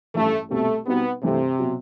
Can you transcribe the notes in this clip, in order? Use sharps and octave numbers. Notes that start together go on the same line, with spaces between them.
A1 G2 E3 A3
C2 B2 G3 A3 C4
B2 G3 B3 C4 D#4 F#4
G2 C3 E3 A3
B2 F#3